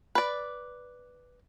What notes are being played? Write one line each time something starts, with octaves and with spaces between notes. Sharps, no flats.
B4 D5